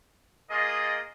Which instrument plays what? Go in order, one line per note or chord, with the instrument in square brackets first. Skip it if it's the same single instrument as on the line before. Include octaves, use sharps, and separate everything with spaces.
[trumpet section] A#3 F4 G#4 D#5